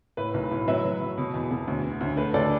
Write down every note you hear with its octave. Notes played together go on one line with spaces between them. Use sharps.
A2 B4
B1
A2
F#3 B4 E5
F#3
F#3
B2
E2
B2
D2
D3
D2
A3 B4
D2 A4 D5